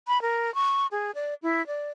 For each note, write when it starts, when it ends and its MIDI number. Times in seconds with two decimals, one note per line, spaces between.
0.08 0.21 83
0.22 0.53 70
0.55 0.87 85
0.91 1.11 68
1.15 1.34 74
1.43 1.65 64
1.67 1.91 74